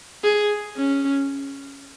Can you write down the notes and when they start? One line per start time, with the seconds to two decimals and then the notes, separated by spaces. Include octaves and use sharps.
0.24 G#4
0.77 C#4